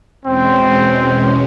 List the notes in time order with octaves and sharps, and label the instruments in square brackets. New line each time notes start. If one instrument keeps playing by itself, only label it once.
[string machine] E2 B2 G#3 C#4 [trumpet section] C4